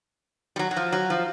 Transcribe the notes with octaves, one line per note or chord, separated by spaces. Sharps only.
G3
F#3
F#3
F3
F#3
F3